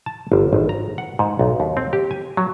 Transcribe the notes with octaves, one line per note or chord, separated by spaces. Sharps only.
A5
G1
G#1
A#5
F#5
G#2
B1
D#2
C4
G4
G#5
F#3